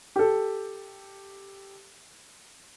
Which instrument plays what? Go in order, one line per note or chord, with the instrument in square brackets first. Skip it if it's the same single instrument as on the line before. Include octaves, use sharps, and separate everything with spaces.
[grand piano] G4 A4